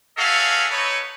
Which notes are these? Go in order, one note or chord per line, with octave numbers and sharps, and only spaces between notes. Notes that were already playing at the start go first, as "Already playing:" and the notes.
C#4 F#4 G#4 A4 E5 F5
D#4 A4 B4 C#5